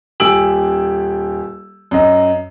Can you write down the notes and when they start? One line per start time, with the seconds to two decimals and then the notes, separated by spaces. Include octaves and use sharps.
0.20 D#1 G4 G#5 E6 D7 F#7
1.91 F#2 D#5